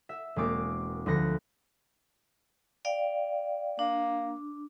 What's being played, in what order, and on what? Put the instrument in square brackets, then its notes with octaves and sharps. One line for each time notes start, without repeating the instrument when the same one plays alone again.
[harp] E5
E1 G#3 A#3 C4 D6 A6
D2 F3 B4 F#6 A#6 C#7
[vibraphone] D5 F5 G5
[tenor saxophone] A#3 [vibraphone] D4